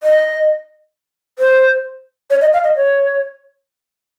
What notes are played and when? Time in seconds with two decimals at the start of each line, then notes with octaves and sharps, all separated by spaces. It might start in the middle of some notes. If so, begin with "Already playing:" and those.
0.03 D#5
1.39 C5
2.30 C#5
2.41 D#5
2.53 F5
2.64 D#5
2.76 C#5